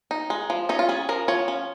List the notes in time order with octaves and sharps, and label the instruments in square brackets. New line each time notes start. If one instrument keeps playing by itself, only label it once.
[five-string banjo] D#4
G#3
F3
C#4 D#4
F4
C#4 G#4
F3 A#4
F3 C#5
C#4